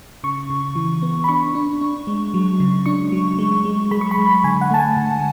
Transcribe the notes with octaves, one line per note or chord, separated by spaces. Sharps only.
C#3 C#6
C#3
E3
B3
B5
D4 C#6
D4
D4
G#3
F#3
C#3
D4 C#6
F#3
G#3
G#3
G#3 B5
C#6
B5
G#3
D3 G#5
F#5
A3 A5
G#5
D3